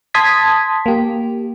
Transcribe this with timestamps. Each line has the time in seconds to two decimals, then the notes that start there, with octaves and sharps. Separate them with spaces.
0.14 A5 C6 D#6 G#6 B6
0.86 A#3 G4